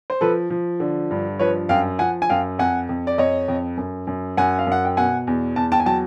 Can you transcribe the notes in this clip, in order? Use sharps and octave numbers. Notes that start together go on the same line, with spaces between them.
C5
F3 A4 B4
F3
D3
G2
F3 B4 C#5
F#2 F5 G5
F3 F#5 G#5
G#5
F#2 F5 G5
F2 F#5 G#5
F2
D5
F2 C#5 D#5
F2
F#2
F#2
F#2 F#5 G#5
F5
F#2 F#5
G5
B2 F#5 G#5
E2
E2 A5
G5 A5
G#5
F#3 G5 A5